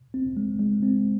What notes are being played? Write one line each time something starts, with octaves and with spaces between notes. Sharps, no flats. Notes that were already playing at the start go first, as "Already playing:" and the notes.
C4
G#3
G#3
C4